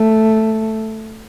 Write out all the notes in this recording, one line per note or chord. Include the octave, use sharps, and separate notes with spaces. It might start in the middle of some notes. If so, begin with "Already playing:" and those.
Already playing: A3